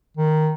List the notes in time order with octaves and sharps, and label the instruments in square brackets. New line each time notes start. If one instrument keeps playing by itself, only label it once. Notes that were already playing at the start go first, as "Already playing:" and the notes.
[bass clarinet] D#3